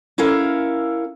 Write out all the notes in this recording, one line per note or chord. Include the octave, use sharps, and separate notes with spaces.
C#4 E4 A4 A#4 F5